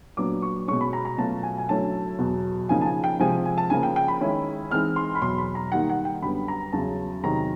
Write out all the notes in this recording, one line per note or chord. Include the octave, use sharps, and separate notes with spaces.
A#2 F#3 B3 D4 D6
C#6
B2 G#3 C#4 C#6
B5
A#5
A#5
B2 F#3 A3 C#4 F4 A5
G#5
G#5
D3 F#3 A3 C#4 E4 A5
E2 B2 F#3
C#3 F3 A#3 D#4 G#5
A5
G#5
G5
C3 F3 G#3 G#5
G#5
A5
C#3 F3 A#3 G#5
G5
G5
B5
D#3 G#3 C#4 E4
E3 G#3 C4 D#4 F6
C6
B5
E2 B2 F#3 C6
B5
A#5
D#3 G3 A#3 D#4 F#5
F#5
G5
F#2 D3 G3 B3 B5
A#5
E2 C#3 F#3 A5
E2 C3 D#3 F#3 A#5